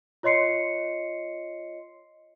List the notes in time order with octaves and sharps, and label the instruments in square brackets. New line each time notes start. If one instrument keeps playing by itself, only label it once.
[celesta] F4 C#5 D#5 C6 C7 C#7